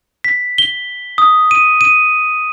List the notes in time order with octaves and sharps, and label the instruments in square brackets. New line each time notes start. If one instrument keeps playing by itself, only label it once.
[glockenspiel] B6
G7
D#6
D#7
D#7